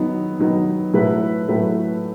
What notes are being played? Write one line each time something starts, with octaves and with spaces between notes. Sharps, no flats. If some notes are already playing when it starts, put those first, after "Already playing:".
Already playing: D#3 F#3 B3 D#4
D#3 F#3 B3 D#4
A2 F#3 A3 E4 B4
A2 F#3 A3 E4 B4